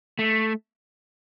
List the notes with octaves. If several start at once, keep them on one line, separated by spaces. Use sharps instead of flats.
A3